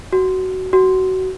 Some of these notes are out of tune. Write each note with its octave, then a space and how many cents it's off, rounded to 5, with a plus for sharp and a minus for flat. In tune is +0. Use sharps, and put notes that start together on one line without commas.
F#4 +15
F#4 +20